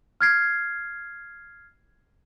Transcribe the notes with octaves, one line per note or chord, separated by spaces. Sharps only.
F6 G#6 C7